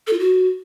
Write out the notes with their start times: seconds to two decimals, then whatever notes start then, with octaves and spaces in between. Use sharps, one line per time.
0.07 A4
0.13 F4
0.19 F#4